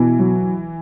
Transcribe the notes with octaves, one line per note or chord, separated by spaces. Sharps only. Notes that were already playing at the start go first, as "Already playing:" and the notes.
Already playing: B2 E3
F#3